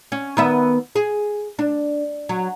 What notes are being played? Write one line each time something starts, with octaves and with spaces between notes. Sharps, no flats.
C#4
D#3 B3 E5
G#4
D4
F#3